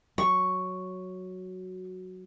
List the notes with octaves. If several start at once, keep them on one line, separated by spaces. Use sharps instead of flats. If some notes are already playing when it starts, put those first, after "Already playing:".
F#3 C#6